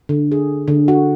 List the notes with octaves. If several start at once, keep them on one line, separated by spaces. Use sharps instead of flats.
D3
G#4
D3
F#4